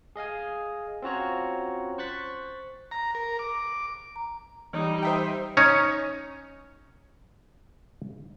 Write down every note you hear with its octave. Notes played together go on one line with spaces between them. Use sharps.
G#4 D#5 F5 G#5
C4 C#4 F4 F#4 C#5 A#5
C5 C#6 F#6 A6 B6
A#5
A#4
D6
A#5
E3 G3 D#4
C5 E5 G5 A#5
C#4 D#4 C#5